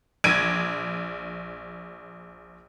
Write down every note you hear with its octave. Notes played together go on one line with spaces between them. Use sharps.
A#1 G#6 D7 D#7